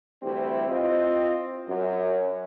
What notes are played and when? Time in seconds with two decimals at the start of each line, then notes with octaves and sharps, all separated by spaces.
0.22 D2 E3 G3 C4 E4 G4
0.68 C4 F4 D#5
1.66 F#2